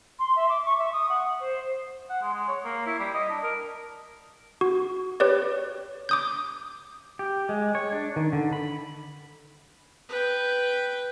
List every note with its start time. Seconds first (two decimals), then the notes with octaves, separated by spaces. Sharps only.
0.19 C6
0.35 E5
0.49 D6
0.65 C#6
0.78 E5
0.92 D#6
1.09 F#5
1.39 C5
2.09 F#5
2.22 G#3
2.34 G#3
2.48 C#5
2.64 A#3
2.87 E4
2.99 G3
3.14 D#5
3.30 D4
3.43 A#4
4.61 F#4
5.20 G4 B4 C#5 D5
6.09 D6 D#6 G6
7.19 G4
7.49 G#3
7.75 C#5
7.92 D4
8.16 D#3
8.33 D3
8.53 B5
10.09 B4 G5